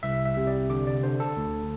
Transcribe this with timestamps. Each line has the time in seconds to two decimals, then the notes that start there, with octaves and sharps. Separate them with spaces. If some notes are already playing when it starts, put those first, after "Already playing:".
0.03 C2 E5
0.25 E5
0.37 C3
0.47 D5
0.70 D3 D6
0.87 D5
1.03 D3 C5
1.20 A4
1.37 D2